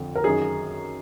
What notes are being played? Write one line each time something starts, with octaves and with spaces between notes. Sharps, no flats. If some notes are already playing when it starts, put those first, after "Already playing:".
Already playing: F2 D3
A#4
F#2 D#3 G#4